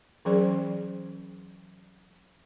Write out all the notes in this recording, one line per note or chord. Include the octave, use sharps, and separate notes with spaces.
E3 F#3 C#4 G#4 C5 D5